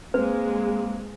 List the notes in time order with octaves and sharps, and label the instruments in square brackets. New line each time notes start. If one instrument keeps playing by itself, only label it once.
[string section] G#3 [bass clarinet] A#3 [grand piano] C4 [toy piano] B4